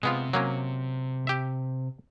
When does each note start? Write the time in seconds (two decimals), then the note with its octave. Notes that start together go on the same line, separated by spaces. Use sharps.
0.03 C3 G#3 B3 F4
0.33 F#3 A#3 C#4
1.27 G4 E5